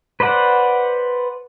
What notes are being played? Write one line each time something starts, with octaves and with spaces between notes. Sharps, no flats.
B4 C5 D5 F#5